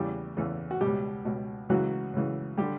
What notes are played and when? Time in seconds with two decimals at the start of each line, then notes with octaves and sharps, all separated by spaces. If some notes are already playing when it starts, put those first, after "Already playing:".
Already playing: E2 C#3 E3 G3 G4
0.37 E2 C#3 E3
0.71 F#4
0.81 B2 G3 G4
0.86 C#2
1.25 C#2 B2
1.69 C#2 C#3 E3 F#3 F#4
2.13 C#2 C#3 E3
2.57 D3 G3 G4